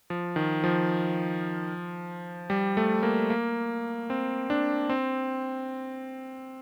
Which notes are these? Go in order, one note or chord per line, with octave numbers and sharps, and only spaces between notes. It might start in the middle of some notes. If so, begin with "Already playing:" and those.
F3
D#3
F3
G3
A3
A#3
A#3
C4
D4
C4